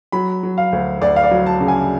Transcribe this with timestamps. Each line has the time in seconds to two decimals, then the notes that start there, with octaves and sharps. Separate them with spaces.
0.12 F#3 B5
0.43 F#3
0.58 F5
0.72 D2
1.01 D2 D5
1.16 F5
1.23 D5
1.31 F#3
1.46 A5
1.60 C#3
1.68 G#5